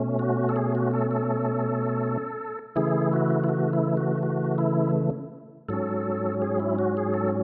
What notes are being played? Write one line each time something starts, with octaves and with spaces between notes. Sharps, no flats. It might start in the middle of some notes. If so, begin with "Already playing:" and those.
Already playing: B2 A3 C#4
F#4
A4
G#4
F#4
A4
A4
C#3 E3 A3 E4 G#4
F#4
E4
F#4
E4
F#4
F#4
E4
G#2 F#3 C#4 A4
G#4
E4
F#4
G#4
A4